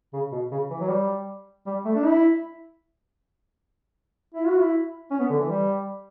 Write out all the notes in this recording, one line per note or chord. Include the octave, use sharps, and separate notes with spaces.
C#3
B2
C#3
E3
F#3
G3
G3
A3
D4
E4
E4
F#4
E4
C#4
B3
D3
E3
G3